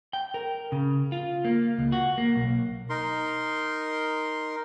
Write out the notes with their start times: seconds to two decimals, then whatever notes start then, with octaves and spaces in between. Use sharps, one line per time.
0.13 G5
0.34 A#4
0.72 C#3
1.12 F4
1.45 A#3
1.79 C#2
1.92 F#4
2.18 A#3
2.36 B1
2.90 D#4 A#4 C6